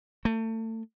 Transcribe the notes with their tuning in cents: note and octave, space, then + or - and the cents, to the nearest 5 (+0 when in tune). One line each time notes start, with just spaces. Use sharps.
A3 +30